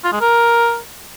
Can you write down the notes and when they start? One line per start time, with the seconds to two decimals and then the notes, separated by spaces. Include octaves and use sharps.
0.04 F4
0.12 G#3
0.21 A#4